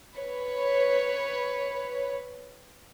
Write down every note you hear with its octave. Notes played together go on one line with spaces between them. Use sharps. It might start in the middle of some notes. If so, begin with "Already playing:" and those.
B4 C#5